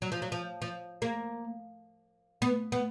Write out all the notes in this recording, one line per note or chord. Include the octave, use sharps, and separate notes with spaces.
F#3
F3
F#3
F3
F3
A#3
B3
B3